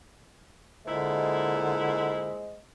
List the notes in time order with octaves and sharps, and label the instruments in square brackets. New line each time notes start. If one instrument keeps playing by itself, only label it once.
[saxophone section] A#2 E4 [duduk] D3 [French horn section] G#3 C5 D#5